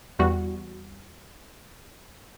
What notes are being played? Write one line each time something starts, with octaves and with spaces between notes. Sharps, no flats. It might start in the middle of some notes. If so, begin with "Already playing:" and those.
E2 G3 F#4